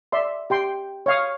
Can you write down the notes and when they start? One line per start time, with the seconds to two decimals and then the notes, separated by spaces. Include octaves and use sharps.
0.12 D5 E5 C6
0.50 G4 G5 C6
1.06 C#5 F5 D#6